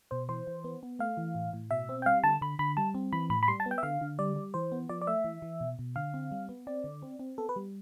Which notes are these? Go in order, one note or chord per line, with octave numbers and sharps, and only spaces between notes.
B2 C5
E3 C5
E3
B3
B3
A3 F5
E3
A2
A2
B2 E5
C4
G5
G3 F5
D3 A5
D3 B5
D3 B5
G3 A5
C4
E3 B5
A2 B5
B5
G3 C6
A5
B3
G5
E5
D3 F5
D3
G3 D5
G3
E3 C5
B3
F3 D5
D5
A3 E5
E3
E3
B2
B2
D3 F5
C4
G3
B3
C4 D5
D3
C4
C4
B3 A4
B4
G3